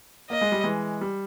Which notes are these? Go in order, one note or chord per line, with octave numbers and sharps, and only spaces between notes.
A#3 D#5
G#3
G3
E3 G#3
G3